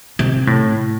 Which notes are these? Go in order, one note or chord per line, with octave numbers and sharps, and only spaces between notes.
C3
A2